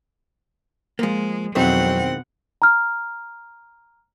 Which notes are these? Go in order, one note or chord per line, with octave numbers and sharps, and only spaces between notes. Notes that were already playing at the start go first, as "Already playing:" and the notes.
F3 G#3 A#3
F2 B2 D#3 F#3 G#3 C4 E4 F#5
A#5 F6